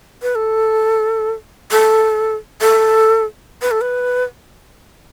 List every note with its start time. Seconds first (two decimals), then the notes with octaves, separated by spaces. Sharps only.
0.23 B4
0.35 A4
1.71 A4
2.61 A4
3.62 B4
3.71 A4
3.81 B4